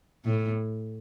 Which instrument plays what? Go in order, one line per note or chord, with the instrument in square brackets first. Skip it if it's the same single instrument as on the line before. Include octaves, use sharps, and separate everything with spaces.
[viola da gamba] A2